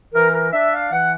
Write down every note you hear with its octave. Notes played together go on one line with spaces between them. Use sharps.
E3 A#4
A#4
D4 E5
F5
E3 F#5